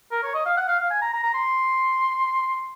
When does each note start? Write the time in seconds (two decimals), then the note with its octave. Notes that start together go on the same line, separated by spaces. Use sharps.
0.12 A#4
0.23 C#5
0.35 D#5
0.45 F5
0.57 F#5
0.68 F5
0.79 F5
0.91 G#5
1.02 A#5
1.13 A#5
1.24 A#5
1.34 C6